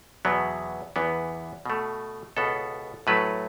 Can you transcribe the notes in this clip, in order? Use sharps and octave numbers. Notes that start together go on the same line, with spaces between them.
E2 B2 F#3 B3
E2 E3 B3
B2 A3
C#2 B2 B3 A4
A2 F#3 A3 B4